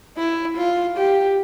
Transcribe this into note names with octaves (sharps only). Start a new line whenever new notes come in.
E4
F4
G4